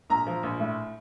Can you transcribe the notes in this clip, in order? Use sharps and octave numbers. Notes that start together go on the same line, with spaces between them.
A#1 A#5
F3
A#1
A2